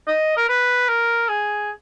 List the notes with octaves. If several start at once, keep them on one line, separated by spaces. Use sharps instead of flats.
D#5
A#4
B4
A#4
G#4